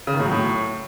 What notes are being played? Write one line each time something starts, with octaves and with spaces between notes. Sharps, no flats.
C#3
D#3
A2
F#3
A2